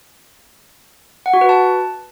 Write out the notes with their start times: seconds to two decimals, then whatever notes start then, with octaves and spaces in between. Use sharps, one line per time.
1.26 F#5
1.34 F#4
1.41 B4
1.49 A5